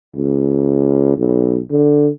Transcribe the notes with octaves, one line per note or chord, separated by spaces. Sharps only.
C#2
B1
D3